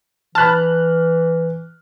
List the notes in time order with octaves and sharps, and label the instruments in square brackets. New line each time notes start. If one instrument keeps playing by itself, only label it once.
[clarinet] E3 [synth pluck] A5 B5 [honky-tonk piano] F6 F#6